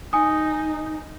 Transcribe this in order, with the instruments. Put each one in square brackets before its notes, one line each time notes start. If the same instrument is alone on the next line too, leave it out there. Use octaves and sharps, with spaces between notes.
[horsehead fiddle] D#4 [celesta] G#5 D#6